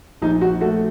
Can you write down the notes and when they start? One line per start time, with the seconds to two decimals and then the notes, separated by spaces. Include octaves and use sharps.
0.22 A#1 D#4
0.41 F#4
0.61 A3 F#4